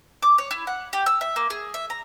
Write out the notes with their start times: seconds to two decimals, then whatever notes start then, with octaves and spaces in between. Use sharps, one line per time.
0.23 D6
0.38 C#5
0.51 E4
0.67 F#5
0.93 G4
1.06 E6
1.21 E5
1.36 A#3
1.50 G#4
1.74 E5
1.90 A#5